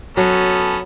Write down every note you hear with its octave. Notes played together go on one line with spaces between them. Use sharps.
F#3 B3 C#4 A4